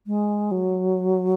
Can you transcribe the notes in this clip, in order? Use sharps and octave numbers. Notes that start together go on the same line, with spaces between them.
G#3
F#3